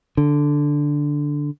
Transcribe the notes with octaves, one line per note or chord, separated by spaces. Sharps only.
D3